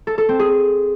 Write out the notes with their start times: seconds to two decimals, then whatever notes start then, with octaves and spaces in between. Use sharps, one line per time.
0.07 A4
0.18 A4
0.29 C4
0.39 G#4